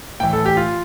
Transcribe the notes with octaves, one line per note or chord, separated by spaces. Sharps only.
A2 E3 G5
A4
G4
F4